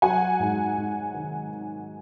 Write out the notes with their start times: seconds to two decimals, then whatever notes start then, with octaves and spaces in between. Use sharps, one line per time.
0.02 F#3 F#5 G#5
0.39 G#2
0.77 G#2
1.14 D#3